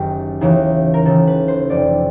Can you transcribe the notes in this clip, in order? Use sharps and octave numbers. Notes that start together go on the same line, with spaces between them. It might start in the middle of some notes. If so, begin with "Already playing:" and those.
Already playing: F#1 F#2 D#3 G4
D#2 C#3 E3
A#4
D#2 C#3 E3 A4
B4
C5
F1 F2 C3 D5